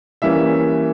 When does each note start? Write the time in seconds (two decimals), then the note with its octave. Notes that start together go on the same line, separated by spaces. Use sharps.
0.22 E3 G3 A#3 C#4 E5